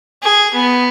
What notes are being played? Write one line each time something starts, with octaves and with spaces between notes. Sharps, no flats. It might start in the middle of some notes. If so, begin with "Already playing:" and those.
G#4
B3